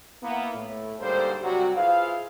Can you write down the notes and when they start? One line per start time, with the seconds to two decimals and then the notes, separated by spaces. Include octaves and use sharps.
0.23 A#3 B3 E4
0.55 A2
1.00 G#2 D3 G3 A#3 A4 C5
1.41 C3 F#3 G3 F#4
1.75 E4 F4 G#4 B4 C5 F5